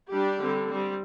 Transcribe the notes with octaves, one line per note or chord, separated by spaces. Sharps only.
G3 D4 G4
D3 G3 C4
G3 C4